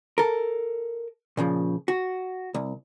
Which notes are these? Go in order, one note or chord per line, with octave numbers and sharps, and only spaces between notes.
A4 A#4
A#2 C#3 F3
F#4
C2